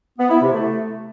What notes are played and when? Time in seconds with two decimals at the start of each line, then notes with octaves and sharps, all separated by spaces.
0.18 B3
0.30 E4
0.41 C3
0.53 A3